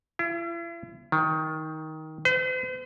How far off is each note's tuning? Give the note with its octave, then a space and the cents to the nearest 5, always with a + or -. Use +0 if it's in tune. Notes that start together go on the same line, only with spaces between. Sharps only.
E4 +45
D#3 +15
C5 -45